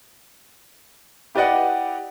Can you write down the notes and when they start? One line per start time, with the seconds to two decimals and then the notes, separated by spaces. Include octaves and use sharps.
1.35 E4 G4 B4 D5 D#5 F#5